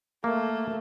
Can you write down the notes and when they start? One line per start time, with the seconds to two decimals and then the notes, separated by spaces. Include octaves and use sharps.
0.24 A3 A#3